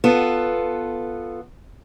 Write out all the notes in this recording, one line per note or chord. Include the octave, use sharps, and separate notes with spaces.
B3 F4 A4